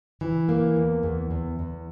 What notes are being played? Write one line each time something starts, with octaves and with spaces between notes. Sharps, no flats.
E3
A#3
E2
E2
E2
E2